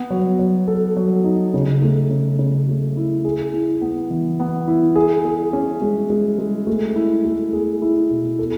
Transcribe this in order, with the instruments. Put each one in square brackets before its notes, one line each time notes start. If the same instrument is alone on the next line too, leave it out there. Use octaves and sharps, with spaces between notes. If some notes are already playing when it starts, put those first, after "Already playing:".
Already playing: [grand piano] B3
F#3
F#3
A4
F#3
D#4
C#3
A3
C#3
C#3
A3
E4
G#4
E4
B3
E3
B3
E4
G#4
G#4
C#4
G#3
G#3
G#3
A3
E4
A3
G#4
E4
B2
A4